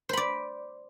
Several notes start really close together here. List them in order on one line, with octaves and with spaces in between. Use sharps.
C5 B5 D5